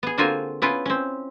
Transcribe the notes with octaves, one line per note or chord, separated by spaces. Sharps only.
B3 G#4
D3 A#3 C4 F4 F#4 G#5
B3 C#4 E4 F4 B4
C4 C#4